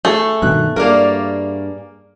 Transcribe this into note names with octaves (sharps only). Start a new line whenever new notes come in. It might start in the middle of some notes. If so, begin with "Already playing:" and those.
A3 G#4
G2 B2 D#3 F#6
G2 A#3 G#4 A#4 D5 F5